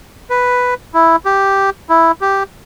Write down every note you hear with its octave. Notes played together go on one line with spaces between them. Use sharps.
B4
E4
G4
E4
G4